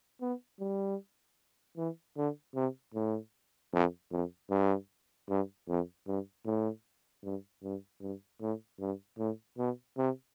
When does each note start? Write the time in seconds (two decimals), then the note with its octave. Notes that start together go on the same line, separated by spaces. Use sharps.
0.22 B3
0.60 G3
1.77 E3
2.17 D3
2.55 C3
2.94 A2
3.73 F2
4.12 F2
4.51 G2
5.29 G2
5.68 F2
6.07 G2
6.46 A2
7.24 G2
7.63 G2
8.01 G2
8.41 A2
8.80 G2
9.19 A2
9.58 B2
9.98 C3